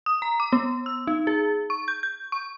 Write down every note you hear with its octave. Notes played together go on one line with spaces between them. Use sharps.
D#6
A#5
D6
B3
E6
D#4
G#4
C#6
G6
G6
C#6